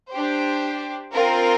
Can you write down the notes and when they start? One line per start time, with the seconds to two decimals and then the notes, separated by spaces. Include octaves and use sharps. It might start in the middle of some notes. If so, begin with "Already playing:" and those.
0.11 D4 G4 C5
1.12 C4 F4 A#4